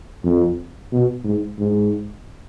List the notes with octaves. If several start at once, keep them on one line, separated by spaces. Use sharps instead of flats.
F2
B2
G#2
G#2